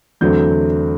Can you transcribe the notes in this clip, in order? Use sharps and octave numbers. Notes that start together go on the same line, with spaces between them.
E2 D3 F#3 A3 C4 G6